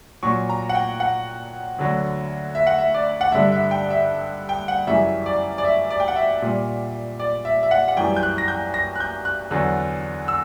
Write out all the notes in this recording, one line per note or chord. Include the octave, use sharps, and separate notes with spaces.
A#2 F#3 C#6
A#5
F#5
G5
F#5
D2 D3 F#3
E5
F#5
E5
D5
F#5
G2 D3 G3 E5
E5
G5
E5
G5
F#5
F#2 C#3 E3 G3 E5
D5
D5
E5
D5
G5
F#5
E5
A#2 G3
D5
E5
E5
F#5
F#5
F#2 E3 G3 G5
G6
F#6
A#6
G6
A#6
F#6
G6
F#6
E2 D3 F#3
E6